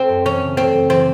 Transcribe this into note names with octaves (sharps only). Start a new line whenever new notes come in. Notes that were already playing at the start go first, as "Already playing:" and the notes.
Already playing: A3 C4
F#2
E3 C#4
C#3
A3 C4
F#2
E3 C4